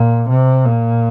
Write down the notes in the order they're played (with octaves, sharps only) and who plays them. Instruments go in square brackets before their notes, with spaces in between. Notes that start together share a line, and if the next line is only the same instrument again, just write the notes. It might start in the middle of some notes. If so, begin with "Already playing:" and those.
Already playing: [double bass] A#2
C3
A#2